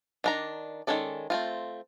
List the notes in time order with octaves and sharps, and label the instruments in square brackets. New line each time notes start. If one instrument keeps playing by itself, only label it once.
[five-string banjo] D#3 D4 A#5
D#3 G#3 C#4 A4 D5
A3 C4 F4